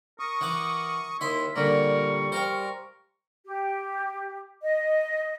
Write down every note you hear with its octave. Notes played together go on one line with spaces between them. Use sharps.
A#4 C#6 D#6
E3 F#5 D6
D#2 E4 E5 C6 B6
A#2 D3 G3 A#4 C#6
A#4 C5 F5 G5
G4
D#5